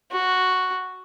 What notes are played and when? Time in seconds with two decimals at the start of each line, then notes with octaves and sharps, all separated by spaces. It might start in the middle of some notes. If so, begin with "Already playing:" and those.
0.12 F#4